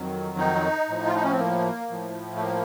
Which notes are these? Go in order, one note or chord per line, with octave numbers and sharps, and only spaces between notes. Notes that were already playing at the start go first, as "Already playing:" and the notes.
Already playing: F2 D#3 F#3
D#4
A2 F3
F4
D#4
C#4
C4
A#3
A2 F3
A3
A#3